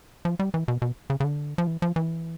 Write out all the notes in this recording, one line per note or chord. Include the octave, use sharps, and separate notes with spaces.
F3
G3
E3
B2
B2
C#3
C#3
D3
F3
E3
F3
E3